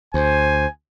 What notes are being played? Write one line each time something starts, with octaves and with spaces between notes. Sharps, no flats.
D2 C5 G#5